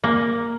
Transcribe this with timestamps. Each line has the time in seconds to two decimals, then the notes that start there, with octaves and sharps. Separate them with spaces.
0.04 A#3